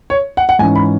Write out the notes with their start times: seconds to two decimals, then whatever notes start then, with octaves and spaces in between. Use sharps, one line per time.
0.10 C#5
0.37 F#5
0.49 F#5
0.59 G#2 E3 C#4 G#5
0.75 B5